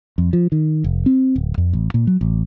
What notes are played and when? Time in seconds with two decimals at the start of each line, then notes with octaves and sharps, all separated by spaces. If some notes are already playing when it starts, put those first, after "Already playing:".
0.18 F2
0.33 F3
0.52 D#3
0.84 F1
1.06 C4
1.36 D1
1.58 F2
1.73 A1
1.94 A#2
2.07 F#3
2.21 A1